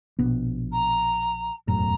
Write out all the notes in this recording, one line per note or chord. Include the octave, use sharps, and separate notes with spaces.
A#1 B2 B3
A#5
E1 F#2 A2 A#5